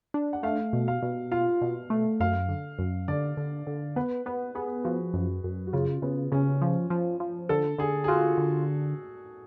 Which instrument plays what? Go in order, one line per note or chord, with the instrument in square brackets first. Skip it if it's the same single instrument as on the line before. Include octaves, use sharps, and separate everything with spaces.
[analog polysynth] D4
[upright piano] F#5
[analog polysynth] A3 [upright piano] F5
[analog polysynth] B2
[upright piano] F5
[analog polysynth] B2
[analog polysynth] F4 [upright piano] F5
[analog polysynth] B2
A3
[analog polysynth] F#2 [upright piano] F5
[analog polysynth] D3
F#2
[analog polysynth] D3 [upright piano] D5
[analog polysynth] D3
D3
[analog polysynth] B3 [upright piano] B4
[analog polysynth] B3 [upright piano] B4
[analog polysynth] B3 [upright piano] G#4
[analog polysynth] F3 [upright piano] F#4
[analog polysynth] F#2
F#2
[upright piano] F#4
[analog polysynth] C#3 [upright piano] F4
[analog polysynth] C#3 [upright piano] B3
[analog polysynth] C#3 [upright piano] C#4
[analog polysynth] F3
F3
F3
[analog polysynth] D3 [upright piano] A4
[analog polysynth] D3 [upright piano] G#4
[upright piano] G#4
[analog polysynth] F4 [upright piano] F#4
[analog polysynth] D3